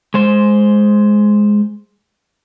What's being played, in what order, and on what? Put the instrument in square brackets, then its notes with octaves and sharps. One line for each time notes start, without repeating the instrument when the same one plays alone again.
[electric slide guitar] G#3 C5